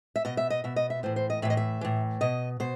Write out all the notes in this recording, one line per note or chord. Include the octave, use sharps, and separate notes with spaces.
E5
B2 D#5
E5
D#5
B2 E5
D#5
E5
A2 E3 C5
C5
D#5
A2 E3 E5
D#5
E5
A2 E3
B2 D#5
B2 C5